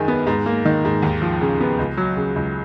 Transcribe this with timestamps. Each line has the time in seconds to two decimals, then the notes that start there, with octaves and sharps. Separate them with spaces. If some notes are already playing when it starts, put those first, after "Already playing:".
Already playing: F#2 D#3 G#3
0.08 B3
0.27 G#2
0.46 A#3
0.65 D#3
0.85 G#2
1.02 D#2
1.22 F3
1.41 C#3
1.61 B3
1.79 C#2
1.97 F#3
2.17 C#3
2.36 C#2